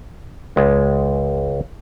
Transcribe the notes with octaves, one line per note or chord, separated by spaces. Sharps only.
C#2 G#3